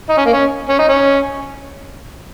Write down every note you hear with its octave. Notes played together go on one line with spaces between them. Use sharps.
D#4
C#4
A#3
C#4
C#4
D#4
C#4